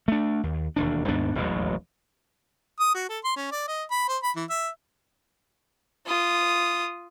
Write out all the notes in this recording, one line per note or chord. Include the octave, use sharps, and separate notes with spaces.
A3 D4
D#2
E1 D#2 D4
D#2 G#2 B3 D4
E1 A1 D#2 F#3
D#6
F#4
A4
C6
C#4
D5
D#5
B5
C5
B5
E3
E5
F4 D#6